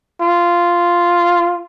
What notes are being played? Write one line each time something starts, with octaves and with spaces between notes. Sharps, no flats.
F4